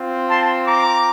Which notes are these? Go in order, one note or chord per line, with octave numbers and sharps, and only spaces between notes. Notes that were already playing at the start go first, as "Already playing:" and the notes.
Already playing: C4 F4
A5 C6
A#5 D6